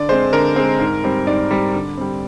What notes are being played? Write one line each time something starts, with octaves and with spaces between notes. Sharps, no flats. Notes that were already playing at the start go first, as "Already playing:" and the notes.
Already playing: D3 D5
G#3 C4 C5
D3 A#4
G#3 C4
G#2
G3 C4
G#2 D5
G3 C4
D3
G3 C4